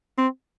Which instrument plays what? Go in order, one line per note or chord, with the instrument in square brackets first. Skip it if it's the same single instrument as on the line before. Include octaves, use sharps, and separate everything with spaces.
[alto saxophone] C4